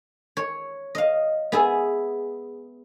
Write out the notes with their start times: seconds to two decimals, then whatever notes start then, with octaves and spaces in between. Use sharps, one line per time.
0.37 C#5
0.95 D#5 F5
1.52 B3 G#4 E5